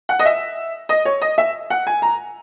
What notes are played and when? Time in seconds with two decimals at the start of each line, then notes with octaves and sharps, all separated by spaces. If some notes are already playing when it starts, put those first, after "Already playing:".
0.09 F#5
0.19 D#5
0.26 E5
0.89 D#5
1.05 C#5
1.22 D#5
1.38 E5
1.70 F#5
1.87 G#5
2.02 A#5